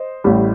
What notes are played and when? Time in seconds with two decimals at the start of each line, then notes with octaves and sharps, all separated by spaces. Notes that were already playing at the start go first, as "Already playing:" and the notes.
Already playing: C5 D#5
0.24 A1 A2 G3